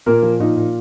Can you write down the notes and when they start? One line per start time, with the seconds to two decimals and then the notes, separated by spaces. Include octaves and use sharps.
0.06 A#2 A#3 A#4
0.23 F3
0.40 A#2 D#4
0.57 A#2